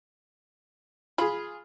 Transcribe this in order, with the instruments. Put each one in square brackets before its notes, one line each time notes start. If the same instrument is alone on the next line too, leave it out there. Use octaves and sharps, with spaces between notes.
[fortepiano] F4 G#4 [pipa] B5